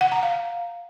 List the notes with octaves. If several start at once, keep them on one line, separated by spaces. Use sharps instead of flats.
F#5
A#5
F5